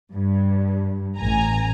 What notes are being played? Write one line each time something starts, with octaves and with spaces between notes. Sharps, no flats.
G2
A1 G#5 A#5